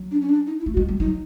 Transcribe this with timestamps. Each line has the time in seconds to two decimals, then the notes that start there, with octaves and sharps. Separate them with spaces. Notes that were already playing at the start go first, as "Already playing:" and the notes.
Already playing: F#3
0.11 D4
0.21 C#4
0.29 D4
0.47 D#4
0.60 E4
0.66 A3
0.73 F#4
0.77 G#3
0.89 G3
1.00 F#3 D#4